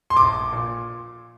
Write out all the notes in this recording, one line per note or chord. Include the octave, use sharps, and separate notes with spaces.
C6
A#1 D6
A#2